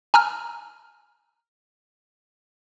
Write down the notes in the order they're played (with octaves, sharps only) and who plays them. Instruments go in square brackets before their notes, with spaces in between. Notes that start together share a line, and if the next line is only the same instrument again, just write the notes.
[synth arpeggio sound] G#5 A#5 E6 F6